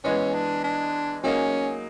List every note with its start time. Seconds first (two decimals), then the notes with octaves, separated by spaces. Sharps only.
0.04 E3 G#3 B3 C#4
0.34 D4
0.64 D4
1.24 F#3 A#3 C#4 D#4 G#4